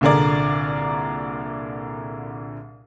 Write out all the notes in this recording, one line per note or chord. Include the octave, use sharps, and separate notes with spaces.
C2 A#2 D3 G#4 A#4 D5